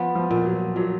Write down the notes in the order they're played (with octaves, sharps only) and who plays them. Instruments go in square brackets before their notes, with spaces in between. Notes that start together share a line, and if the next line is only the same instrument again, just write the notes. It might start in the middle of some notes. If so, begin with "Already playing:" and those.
Already playing: [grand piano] F3 [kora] B3
[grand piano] F3
[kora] A#2
[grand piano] F#3
[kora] A#2 [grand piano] F#3